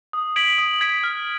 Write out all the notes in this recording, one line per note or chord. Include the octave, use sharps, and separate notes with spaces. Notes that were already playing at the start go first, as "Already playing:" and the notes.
D#6
G#6 B6 D7 F#7
D#6
G#6 B6 D7 F#7
F6